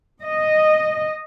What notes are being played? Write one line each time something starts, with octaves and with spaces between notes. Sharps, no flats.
D#5